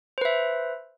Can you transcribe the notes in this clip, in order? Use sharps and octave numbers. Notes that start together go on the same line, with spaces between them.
B4 C5 E5